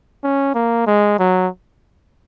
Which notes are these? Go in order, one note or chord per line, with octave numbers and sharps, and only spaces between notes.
C#4
A#3
G#3
F#3